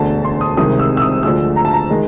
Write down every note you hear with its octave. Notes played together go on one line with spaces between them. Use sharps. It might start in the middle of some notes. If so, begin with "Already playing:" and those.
Already playing: E1 D2 D3 A5
C6
D#6
C2 C3 D#3 G#3 D#6
E6
E6
D#6
D2 D3 F3 G#3 E6
A#5
A5
A#5
D#3 G#3